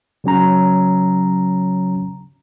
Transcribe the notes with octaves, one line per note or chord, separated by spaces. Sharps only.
C#3 F#3 C#4 A#5